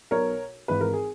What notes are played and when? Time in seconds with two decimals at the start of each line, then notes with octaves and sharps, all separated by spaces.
0.11 B1 B2 A#4 C#5
0.68 G#1 G#2 E3 B4
0.81 A#4
0.93 G#4